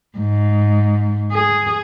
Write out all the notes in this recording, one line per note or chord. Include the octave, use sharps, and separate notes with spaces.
G#2
G#4